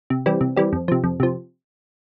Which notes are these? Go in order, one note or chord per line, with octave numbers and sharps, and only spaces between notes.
C3
E3 G3 C4
C3
E3 G3 C4
F2
C3 F3
F2
C3 F3